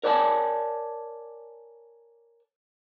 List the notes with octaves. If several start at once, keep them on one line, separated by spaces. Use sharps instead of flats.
A#4 C#5 D5 G#5 A5